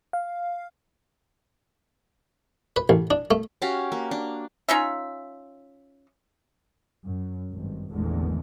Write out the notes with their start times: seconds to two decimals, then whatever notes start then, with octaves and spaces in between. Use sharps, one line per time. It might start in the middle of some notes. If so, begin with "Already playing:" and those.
0.13 F5
2.76 B4
2.89 A1
3.11 D4
3.31 A3
3.62 C#4 F#4 G4 F5
3.92 A#3
4.11 D4
4.68 C#4 D#4 F4 E5
7.04 F#2
7.51 G#1 G2
7.92 G#1 E2 A#2 D3 G#3 A3